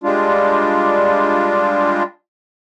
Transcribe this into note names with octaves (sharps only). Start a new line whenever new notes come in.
G3 G#3 D4 F4